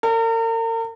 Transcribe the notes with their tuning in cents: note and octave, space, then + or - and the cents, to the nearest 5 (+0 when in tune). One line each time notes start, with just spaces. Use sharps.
A#4 -40 D5 -45